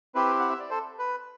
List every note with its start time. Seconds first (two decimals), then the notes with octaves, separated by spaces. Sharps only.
0.15 C4 E4 G4 B4
0.39 F#5
0.50 E5
0.60 D5
0.70 A4 C5
0.99 B4